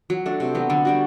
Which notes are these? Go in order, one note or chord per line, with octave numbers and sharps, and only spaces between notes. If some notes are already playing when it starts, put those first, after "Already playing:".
F#3
A3 D4
C3
F#3 B3
D3
G3 D4 F#4